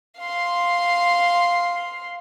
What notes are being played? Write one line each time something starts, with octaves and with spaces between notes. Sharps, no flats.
F5 C6